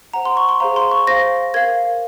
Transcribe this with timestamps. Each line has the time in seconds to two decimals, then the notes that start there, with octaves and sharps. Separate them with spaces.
0.14 C5 F#5 A#5
0.25 C6
0.37 C#6
0.49 C6
0.60 G#4 C5 F5 A#5
0.76 C6
0.91 C#6
1.07 C5 F5 A#6
1.54 A#4 F5 G#6